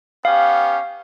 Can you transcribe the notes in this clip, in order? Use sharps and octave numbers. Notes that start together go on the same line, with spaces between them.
B3 C#4 G4 F5